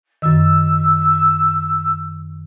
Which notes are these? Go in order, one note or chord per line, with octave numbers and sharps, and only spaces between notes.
F#2 D#3 E6